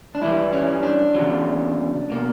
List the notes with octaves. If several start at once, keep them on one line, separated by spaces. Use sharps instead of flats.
D4
G2 E3 G3 E4
C#4
D4
E2 C#3 F#3
B2 A#3